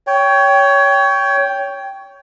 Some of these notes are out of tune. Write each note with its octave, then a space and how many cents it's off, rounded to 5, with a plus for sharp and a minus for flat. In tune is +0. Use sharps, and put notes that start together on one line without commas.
C#5 +20 G5 +0